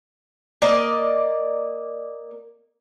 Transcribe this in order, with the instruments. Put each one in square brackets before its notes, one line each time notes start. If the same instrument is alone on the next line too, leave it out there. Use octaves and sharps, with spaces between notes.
[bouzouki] A#3 D5 D#5